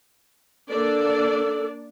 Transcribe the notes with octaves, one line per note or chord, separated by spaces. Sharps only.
A#3 D4 A4 D5